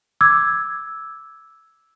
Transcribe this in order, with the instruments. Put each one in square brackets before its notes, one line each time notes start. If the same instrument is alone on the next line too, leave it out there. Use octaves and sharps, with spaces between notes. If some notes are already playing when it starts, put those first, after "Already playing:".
[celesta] D6 E6 G#6